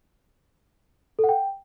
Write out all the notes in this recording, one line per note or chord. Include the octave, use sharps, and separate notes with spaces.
A4
F#5
G5